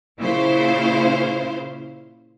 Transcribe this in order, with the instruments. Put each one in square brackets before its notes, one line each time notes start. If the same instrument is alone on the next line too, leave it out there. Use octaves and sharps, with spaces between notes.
[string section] A#2 C#3 E4 C5 F5